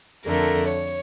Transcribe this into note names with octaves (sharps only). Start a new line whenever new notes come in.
F2 D3 A3 A#4
C#5